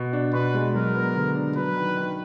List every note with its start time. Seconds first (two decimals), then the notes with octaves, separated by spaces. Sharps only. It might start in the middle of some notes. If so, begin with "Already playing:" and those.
Already playing: B2
0.13 D4
0.33 B2 B4
0.54 G#3
0.74 F#3 A#4
0.95 B3
1.15 D3
1.35 D4
1.56 F#3 B4
1.76 D#3
1.97 D#3